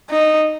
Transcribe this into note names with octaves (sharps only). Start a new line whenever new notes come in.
D#4